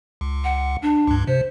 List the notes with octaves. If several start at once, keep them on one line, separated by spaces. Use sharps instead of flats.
C#2
F#5
D4
C#2 G2
C3 C5